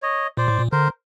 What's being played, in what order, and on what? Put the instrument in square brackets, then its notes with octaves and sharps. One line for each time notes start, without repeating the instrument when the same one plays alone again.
[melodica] C#5 D#5
[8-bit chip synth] A#2 [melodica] C5 D5
[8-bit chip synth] A2
A#2
[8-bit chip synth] D3 [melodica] A#4 C5